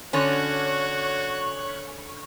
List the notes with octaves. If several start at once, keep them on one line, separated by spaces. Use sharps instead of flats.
D3 C#4 F#4 C#5 F#6